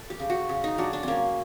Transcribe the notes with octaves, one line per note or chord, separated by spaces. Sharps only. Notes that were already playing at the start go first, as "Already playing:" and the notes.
Already playing: A4
G4
C#3
F#4
C#3
D#4
F#3 D4
D4
A#3 C4 C#4